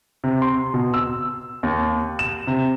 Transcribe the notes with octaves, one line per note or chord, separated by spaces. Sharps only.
C3
C6
B2
E6
D#2
E7
C3